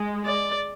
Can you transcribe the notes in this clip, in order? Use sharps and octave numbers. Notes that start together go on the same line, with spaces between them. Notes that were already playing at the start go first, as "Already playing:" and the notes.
Already playing: G#3
D5